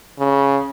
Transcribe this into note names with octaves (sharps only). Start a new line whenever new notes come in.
C#3